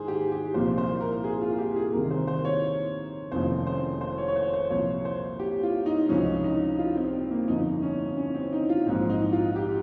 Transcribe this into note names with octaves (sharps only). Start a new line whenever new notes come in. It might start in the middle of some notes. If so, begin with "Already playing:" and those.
Already playing: G#2 D#3 G#4 C5
G4
G4
C2 A#2 F3 C5
C5
A#4
G#4
F4
G4
G#4
C2 C3 D#3 A#4
C5
C5
C#5
F1 D#2 C#3 F3 C5
C5
C5
C#5
C#5
C5
C5
C2 A#2 F3 C#5
C5
G4
F4
D#4
C#2 C3 F3 C#4
D#4
F4
C4
C4
A#3
G1 F2 C#3 F3 D#4
C#4
C#4
C4
D#4
F4
A#1 G#2 F3 C4
D#4
F4
G4